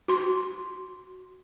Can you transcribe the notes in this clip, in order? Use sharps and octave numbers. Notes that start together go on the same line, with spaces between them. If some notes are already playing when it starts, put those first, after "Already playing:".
F#4 C6